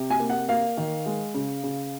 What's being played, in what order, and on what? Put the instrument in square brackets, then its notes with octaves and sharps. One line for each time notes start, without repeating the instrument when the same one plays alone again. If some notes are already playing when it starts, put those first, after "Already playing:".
Already playing: [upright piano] C3
G#5
A#3
F#5
A#3 F5
D#3
G#3
C#3
C#3